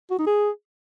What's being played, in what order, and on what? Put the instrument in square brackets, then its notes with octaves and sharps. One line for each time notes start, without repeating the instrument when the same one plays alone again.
[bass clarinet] F#4
D#4
G#4